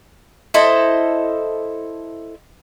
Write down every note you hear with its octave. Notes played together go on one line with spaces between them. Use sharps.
E4 A4 C5 D#5